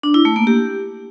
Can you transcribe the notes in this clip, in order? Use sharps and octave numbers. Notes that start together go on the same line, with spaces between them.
D4
E4
A3
A#3
G4